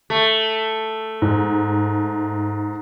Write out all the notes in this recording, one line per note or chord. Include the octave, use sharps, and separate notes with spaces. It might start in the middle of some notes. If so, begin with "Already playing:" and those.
A3
G#2